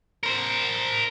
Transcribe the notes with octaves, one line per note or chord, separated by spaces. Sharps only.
A#4 C5